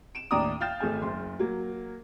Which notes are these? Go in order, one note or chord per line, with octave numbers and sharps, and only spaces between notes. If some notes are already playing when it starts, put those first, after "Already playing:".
D7 E7
D#2 A2 D4 A#5 D6 D#6
F5 G5 F6 G6 A6 E7
G#1 A3 G#4 G#5
F#1 C6
F#3 A#3